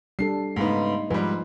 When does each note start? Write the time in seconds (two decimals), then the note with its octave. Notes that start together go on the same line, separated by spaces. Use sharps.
0.19 G3 D4 A4 C7
0.56 G#2 C#3 A3 B3 D#4
1.10 G#2 F3 G3 B4